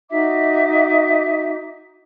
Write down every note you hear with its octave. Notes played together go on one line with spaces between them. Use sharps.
D#4 F#4 E5 D6